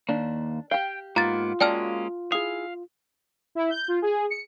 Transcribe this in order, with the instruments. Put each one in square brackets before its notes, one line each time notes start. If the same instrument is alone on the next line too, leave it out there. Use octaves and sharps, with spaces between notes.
[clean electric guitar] D#2 A#3 [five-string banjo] D4
[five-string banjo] G4 F5 [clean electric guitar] G5
[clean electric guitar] G#2 A#3 B3 [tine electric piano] F4 [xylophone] A#5 A6
[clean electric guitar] G#3 A#3 C#4 [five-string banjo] F#4 D5 [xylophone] G5 A5 F6
[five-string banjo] E4 G#4 [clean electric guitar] F5 [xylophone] D#6
[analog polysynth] E4
G6
F4
G#4
C#7